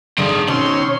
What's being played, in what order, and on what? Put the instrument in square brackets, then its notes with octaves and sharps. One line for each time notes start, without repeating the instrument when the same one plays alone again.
[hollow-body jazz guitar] G2 D3 D#3 [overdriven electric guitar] C4 G#4
[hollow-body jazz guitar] B2 [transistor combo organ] D#3 C4 C#4 [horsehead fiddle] C#5 [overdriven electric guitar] C6